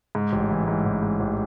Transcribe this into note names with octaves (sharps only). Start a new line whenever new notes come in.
G#2
A1
E3
G#2
A1
G#2
A1